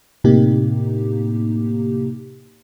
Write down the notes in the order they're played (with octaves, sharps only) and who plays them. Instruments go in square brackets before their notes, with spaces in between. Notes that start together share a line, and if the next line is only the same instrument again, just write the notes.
[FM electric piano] A2 C3 A#3 D#4 G4